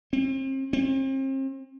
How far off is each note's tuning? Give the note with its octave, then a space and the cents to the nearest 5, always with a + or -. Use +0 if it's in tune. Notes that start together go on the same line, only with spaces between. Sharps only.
C4 +35
C4 +40